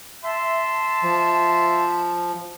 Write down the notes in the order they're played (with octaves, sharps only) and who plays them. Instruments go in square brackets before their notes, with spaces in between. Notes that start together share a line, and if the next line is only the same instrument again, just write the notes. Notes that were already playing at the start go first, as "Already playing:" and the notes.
[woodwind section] E5 A5 [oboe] C6
[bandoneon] F3